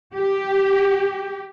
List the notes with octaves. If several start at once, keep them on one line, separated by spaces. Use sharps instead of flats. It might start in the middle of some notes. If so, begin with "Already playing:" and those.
G4